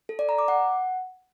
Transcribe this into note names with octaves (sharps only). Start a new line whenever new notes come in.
A4
D5
A#5
D6
F#5